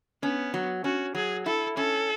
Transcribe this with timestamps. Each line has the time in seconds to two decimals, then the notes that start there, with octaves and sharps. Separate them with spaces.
0.22 B3 C#4
0.54 F#3
0.84 C#4 F#4
1.15 F#3 G#4
1.46 E4 A4
1.77 C#4 A4